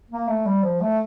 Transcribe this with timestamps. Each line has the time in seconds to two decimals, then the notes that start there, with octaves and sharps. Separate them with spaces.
0.11 A#3
0.28 A3
0.46 G3
0.63 F3
0.81 A3